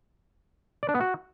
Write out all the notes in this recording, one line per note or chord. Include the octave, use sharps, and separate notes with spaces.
D5
D4
B3
F#4